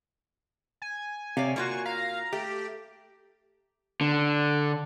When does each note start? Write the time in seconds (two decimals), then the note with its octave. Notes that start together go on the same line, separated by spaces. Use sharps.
0.82 G#5
1.37 C3 C#5 D5 F5
1.56 A#3 F4 F#4 C#6
1.86 F5 A#5
2.33 A3 G4
4.01 D3